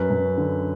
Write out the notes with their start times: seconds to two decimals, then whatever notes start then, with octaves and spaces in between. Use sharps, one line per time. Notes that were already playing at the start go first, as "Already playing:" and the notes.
Already playing: F#2 B4
0.10 F#2
0.38 D3